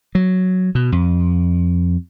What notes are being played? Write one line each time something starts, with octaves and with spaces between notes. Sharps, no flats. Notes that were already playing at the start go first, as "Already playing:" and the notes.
F#3
B2
F2